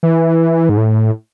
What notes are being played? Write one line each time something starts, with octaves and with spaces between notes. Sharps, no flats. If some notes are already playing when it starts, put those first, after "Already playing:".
E3
G#2
A2